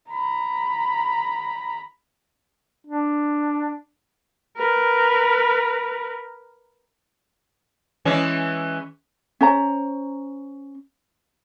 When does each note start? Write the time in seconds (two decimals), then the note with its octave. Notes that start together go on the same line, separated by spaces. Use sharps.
0.10 A#5 B5
2.87 D4
4.57 A#4 B4
8.05 E3 G#3 C#4
9.41 C#4 C5 A#5